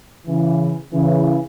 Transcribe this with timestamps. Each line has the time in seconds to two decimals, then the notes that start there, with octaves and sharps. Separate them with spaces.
0.27 C#3 E3
0.92 C#3 E3